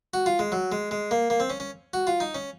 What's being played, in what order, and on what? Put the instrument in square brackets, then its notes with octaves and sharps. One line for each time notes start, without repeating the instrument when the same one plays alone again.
[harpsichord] F#4
F4
G#3
F#3
G#3
G#3
A#3
A#3
C4
C#4
C#4
F#4
F4
D#4
C#4